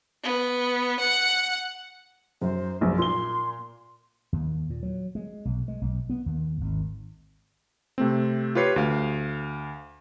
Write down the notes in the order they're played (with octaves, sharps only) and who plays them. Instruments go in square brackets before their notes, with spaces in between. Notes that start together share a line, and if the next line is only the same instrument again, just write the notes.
[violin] B3
F#5
[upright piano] F#2 [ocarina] C5
[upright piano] A#1 F#2
[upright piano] A#2 A#3 G7 [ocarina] C6
[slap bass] D#2
A#2
F#3
G#3
B1
G#3
B1
B3
D#2
G#1
[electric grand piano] C3 A3 C4
F4 G4 B4 C#5 C7
D2 F5